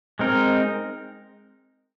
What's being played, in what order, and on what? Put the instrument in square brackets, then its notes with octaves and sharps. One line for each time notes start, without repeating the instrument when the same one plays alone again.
[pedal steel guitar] G#3 C4 D#4 A#4